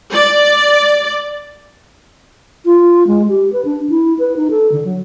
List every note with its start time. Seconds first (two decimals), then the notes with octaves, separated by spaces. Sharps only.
0.14 D5
2.65 F4
3.07 G#3
3.29 G4
3.53 B4
3.65 D4
3.90 E4
4.19 B4
4.37 D#4
4.51 A4
4.72 D3
4.85 F#3